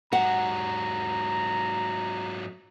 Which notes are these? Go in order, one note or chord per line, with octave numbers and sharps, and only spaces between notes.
G#2 F#3 F#5 A#5